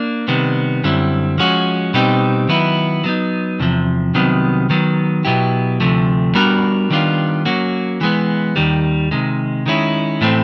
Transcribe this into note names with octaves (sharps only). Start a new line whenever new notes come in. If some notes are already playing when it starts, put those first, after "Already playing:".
Already playing: A#3 D4
C3 D#3 G3 B3
F#2 D3 G3 C4 E4
F3 G#3 C#4 F#4
B2 G3 C4 D#4 G4
D#3 F#3 B3 E4
F#3 B3 D#4
E2 C3 F3
C2 C3 D#3 F#3 B3
D#3 F#3 B3
B2 F#3 B3 E4 G4
D2 C3 F3 A3
G3 B3 D4 F#4 A#4
D#3 G3 B3 D4 F4
F#3 A#3 C#4 F#4
E3 G#3 B3
D#2 D#3 G3
C3 D#3 G#3
D#3 G#3 C#4 E4
A2 E3 A3 C4